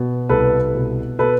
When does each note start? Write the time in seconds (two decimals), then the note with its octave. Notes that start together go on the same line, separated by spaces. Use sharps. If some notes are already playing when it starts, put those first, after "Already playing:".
Already playing: B2
0.29 C2 A4 B4
0.74 B2
1.19 B2 A4 B4